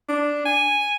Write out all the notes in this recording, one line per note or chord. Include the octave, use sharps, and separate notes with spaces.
D4
G#5